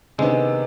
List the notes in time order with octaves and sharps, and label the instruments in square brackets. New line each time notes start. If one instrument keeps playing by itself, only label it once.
[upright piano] C3 D#3 B3 D4 [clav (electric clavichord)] G#3